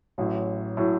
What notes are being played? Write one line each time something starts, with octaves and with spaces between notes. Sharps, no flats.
A1 A2 F#3
A2 F#3